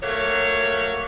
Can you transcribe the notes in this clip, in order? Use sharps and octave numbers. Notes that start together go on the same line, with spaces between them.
F#3 A3 A#3 C#5